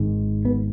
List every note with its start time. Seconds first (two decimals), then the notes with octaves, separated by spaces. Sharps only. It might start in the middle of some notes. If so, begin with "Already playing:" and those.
Already playing: G#1 G#2
0.45 B3